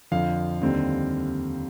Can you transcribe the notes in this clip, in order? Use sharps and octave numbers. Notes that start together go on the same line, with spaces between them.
F2 D3 F3 F5
D#2 D3 G3 C4